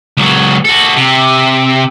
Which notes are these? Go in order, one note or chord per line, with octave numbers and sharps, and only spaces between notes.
C#2 F#3
F#4 A4
C3